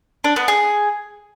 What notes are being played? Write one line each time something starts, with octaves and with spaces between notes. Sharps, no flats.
D4
B3
G#4